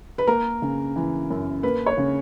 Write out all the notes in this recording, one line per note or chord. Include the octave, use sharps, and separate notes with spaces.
B4
A#3 A#4
C#3
E3
F#2
A#3 B4
C#5
C#3